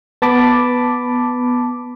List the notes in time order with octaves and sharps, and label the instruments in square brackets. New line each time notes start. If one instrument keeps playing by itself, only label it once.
[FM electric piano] B3 A5 B5 D6